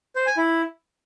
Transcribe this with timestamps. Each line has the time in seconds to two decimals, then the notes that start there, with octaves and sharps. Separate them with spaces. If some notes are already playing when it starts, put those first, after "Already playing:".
0.16 C5
0.26 G#5
0.37 E4